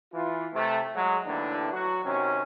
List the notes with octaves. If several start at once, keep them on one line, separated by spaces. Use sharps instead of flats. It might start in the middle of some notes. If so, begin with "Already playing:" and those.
E3 F4
C3 A3
F#3 G#3
D#2 A2 D3 E3 D4
F#3 F#4
C3 D#3 F#3 C#4